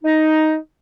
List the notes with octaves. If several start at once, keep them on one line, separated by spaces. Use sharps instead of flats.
D#4